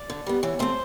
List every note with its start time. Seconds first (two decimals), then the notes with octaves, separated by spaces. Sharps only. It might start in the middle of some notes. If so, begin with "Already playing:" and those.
Already playing: D5
0.10 D3
0.26 G3 B3
0.43 E3 C#5
0.59 A3 C4 C5